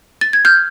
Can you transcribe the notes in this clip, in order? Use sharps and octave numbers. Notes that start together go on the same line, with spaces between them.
A6
G#6
F6 G6